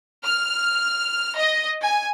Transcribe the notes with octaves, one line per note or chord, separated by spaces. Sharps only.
F6
D#5
G#5